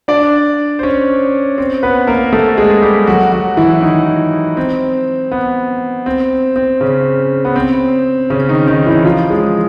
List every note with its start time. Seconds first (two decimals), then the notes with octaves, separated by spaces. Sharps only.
0.08 D4 D5
0.79 C5
0.83 C#4 C#5
1.58 C4 C5
1.83 B3 B4
2.07 A#3 A#4
2.33 A3 A4
2.57 G#3 G#4
2.82 G3 G4
3.07 F#3 F#4
3.32 F#3 F#4
3.57 E3 E4
3.82 D#3 D#4
4.57 C4
5.32 B3
6.06 C4
6.56 C4
6.81 C#3 C#4
7.45 B3
7.56 C4
8.30 C#3 C#4
8.49 D#3 D#4
8.67 D#3 D#4
8.86 E3 E4
9.05 F3 F4
9.30 G#3 G#4